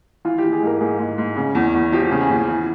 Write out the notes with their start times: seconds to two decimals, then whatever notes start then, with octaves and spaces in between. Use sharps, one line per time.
0.25 E3 F4
0.38 G4
0.43 E3
0.52 G#4
0.62 G#2 A#4
0.80 G#2 G#4
0.99 G#2
1.18 G#2
1.37 C#3
1.55 E2
1.74 E2
1.92 F3 G4
2.11 C#3
2.21 G#4
2.30 E2
2.48 E3